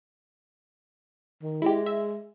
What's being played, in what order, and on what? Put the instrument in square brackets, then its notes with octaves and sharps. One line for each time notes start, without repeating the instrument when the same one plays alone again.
[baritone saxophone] D#3
[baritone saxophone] G#3 [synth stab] E4 G4
[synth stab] E5